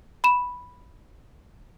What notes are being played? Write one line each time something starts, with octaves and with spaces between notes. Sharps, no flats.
B5 E7